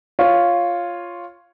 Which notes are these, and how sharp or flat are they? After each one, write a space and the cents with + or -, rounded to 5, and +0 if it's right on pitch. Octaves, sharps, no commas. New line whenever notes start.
F4 +0 C#5 +0